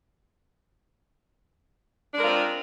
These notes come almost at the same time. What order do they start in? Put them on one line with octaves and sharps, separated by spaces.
D4 G#3 A#4 F4 C4